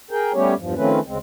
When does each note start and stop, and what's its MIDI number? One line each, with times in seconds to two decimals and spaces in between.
0.11 0.32 68
0.11 0.32 70
0.11 0.32 79
0.34 0.54 55
0.34 0.54 57
0.34 0.54 59
0.34 0.54 61
0.34 0.54 67
0.34 0.54 73
0.58 0.75 40
0.58 0.75 43
0.58 0.75 53
0.76 1.00 51
0.76 1.00 53
0.76 1.00 57
0.76 1.00 60
0.76 1.00 61
0.76 1.00 71
1.07 1.18 38
1.07 1.18 49
1.07 1.18 56
1.07 1.18 60